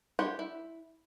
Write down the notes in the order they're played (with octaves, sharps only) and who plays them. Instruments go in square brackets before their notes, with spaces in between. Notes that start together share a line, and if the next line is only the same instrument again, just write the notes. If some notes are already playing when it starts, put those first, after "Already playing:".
[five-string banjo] F#4 G4 C5 C#5 F#5
E4